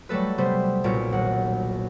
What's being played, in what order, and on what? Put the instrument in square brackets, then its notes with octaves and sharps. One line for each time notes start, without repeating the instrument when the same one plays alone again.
[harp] F#3 G3 A3 A4 B4
C3 G3 A3 B3 C5
B1 A#2 C#4 D7
D#1 F#5